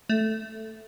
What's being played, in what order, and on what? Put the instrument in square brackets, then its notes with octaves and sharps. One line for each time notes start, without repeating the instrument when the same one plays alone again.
[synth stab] A3